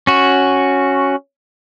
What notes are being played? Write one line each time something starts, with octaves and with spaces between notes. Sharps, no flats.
C#4 F#4